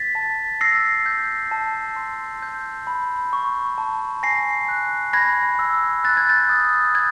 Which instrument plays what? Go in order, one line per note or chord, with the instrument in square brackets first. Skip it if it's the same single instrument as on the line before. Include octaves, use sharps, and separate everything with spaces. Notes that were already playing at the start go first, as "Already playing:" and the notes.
Already playing: [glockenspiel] A6 B6
A5
E6 A#6 C7
G6
A5
C6
G6
B5
C#6
A5
G#5 A#6 C7
F#6
B5 G#6 A#6
E6
F#6 A6
G#6
G6 A6
D#6
G6 G#6